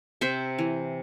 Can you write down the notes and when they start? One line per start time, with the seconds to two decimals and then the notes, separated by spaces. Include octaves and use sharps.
0.21 C3 C5 E5
0.58 E3